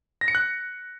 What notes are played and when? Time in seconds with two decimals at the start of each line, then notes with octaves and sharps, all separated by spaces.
0.21 A#6
0.28 C#7
0.35 F#6